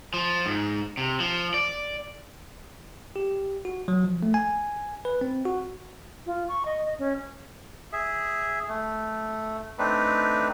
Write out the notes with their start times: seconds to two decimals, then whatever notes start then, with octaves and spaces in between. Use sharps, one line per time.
0.14 F3
0.46 G#2
0.97 C3
1.20 F3
1.54 D5
3.16 G4
3.65 F#4
3.88 F#3
4.04 F3
4.23 A3
4.34 G#5
5.05 B4
5.21 C4
5.45 F#4
6.26 F4
6.49 C#6
6.65 D#5
6.86 D#5
6.99 C#4
7.93 G#4 E5
8.69 A3
9.79 A3 C4 D4 D#4 B4